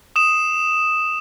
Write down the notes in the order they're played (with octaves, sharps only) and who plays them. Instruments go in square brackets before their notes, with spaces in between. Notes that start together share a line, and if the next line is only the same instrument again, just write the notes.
[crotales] D#6 E7